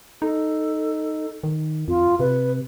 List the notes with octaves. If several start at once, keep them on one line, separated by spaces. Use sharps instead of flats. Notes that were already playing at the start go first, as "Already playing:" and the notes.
D#4 A4
D#3
F2 F4
C3 B4